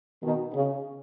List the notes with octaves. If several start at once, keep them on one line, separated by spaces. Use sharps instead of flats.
B2 D#3
C#3